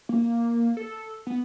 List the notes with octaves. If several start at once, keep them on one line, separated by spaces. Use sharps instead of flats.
A#3
A4
B3